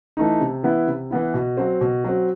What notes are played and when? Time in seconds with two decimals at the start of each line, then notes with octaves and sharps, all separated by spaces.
0.17 E3 A3 D#4
0.40 C3
0.63 E3 B3 E4
0.87 C3
1.10 E3 B3 E4
1.34 B2
1.57 F#3 C4
1.81 B2
2.04 F#3 C4